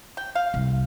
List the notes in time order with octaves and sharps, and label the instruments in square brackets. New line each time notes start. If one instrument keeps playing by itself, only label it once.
[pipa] G5
F5
[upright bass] C2